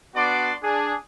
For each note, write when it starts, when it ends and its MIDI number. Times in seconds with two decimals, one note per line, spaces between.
0.15 0.52 59
0.15 0.52 62
0.15 0.52 66
0.15 0.52 74
0.15 0.52 84
0.15 0.52 86
0.62 0.94 62
0.62 0.94 68